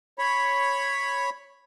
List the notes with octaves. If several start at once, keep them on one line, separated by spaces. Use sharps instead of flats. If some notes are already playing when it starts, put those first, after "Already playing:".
C#5 B5